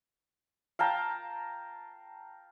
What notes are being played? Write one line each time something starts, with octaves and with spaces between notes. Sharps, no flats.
F5 G5 A5 A#5